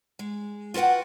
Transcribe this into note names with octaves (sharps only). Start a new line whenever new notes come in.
G#3
F4 F#4 B4 F#5 G5